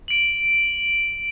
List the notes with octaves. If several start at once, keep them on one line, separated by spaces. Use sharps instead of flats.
D7 F#7